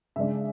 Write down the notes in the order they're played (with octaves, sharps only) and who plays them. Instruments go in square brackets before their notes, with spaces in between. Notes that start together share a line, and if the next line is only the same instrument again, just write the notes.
[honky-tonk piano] C#3 G#3 D4 E5